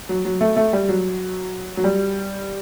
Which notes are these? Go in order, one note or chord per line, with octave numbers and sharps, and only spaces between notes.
F#3
F#3
A3
A3
G3
F#3
F#3
G3